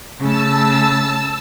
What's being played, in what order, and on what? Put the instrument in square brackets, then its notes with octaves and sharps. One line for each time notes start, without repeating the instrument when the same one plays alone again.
[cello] C#3 A3 [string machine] A5 E6